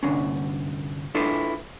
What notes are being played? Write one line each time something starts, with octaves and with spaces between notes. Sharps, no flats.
C2 G2 D3 C#4
D4 E4 F4 A4 B4